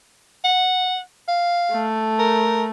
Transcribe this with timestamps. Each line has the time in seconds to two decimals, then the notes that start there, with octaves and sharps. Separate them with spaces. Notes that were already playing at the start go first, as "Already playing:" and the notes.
0.44 F#5
1.28 F5
1.72 A3
2.19 A#4